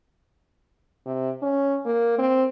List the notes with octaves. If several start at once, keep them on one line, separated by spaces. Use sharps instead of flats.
C3
C#4
A#3
C4